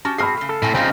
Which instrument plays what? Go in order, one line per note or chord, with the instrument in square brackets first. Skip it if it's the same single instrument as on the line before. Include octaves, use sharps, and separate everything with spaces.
[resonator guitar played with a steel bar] C#4 F#4 G4 [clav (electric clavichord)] A5
[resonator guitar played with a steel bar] C4 F#4 G#4 [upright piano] B5 F6 C7
[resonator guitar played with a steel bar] C#3 A3
[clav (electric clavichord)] A4
[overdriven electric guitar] A2 [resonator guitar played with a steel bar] C4 G#5
[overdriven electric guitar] C#3 D#4 [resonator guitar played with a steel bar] F3 F4 C#5 [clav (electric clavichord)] C4